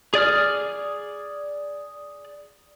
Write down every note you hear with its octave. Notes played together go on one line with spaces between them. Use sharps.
G#4 D5 D#6 F6